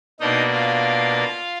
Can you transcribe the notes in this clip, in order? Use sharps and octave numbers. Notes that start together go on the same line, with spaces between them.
B2 A#3 D4 D#4 D#5
F4 F5